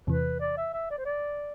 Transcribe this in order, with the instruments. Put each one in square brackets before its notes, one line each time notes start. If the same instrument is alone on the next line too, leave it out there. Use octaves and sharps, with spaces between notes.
[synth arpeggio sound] E2 C3 E3 [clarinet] B4
[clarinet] D5
E5
E5
D5
C5
D5